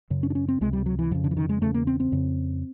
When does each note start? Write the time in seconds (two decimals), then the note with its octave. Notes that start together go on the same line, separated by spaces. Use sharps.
0.10 F#2 C#3
0.23 C#4
0.30 D4
0.35 C#4
0.48 C4
0.61 C#2 C3 G#3
0.73 G3
0.86 F#3
0.99 E3
1.11 F2 D3
1.14 C#3
1.24 D3
1.31 E3
1.37 D#3
1.49 G#3
1.61 E2 C#3 A3
1.74 A#3
1.87 C4
2.00 C4
2.12 F2 C#3